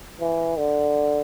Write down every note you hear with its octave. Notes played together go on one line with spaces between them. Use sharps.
E3
D3